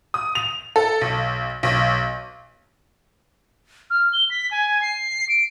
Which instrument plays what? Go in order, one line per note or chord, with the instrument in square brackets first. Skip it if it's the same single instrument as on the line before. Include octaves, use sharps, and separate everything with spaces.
[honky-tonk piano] D#6
F7
A4
B1
B1
[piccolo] F6
G7
B6
G#5
C7
D7